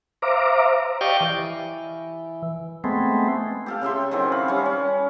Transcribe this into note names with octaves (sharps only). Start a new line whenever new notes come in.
C5 E5 F5 A#5 D6
G4 D5 D#5 F5 G5 C#6
E3
G#3 A3 B3 C4
G4 A4 F5
C#3 G4 E5 C6
D#3 E3 F#3 C4
F5 B5
G3 C#4
C#4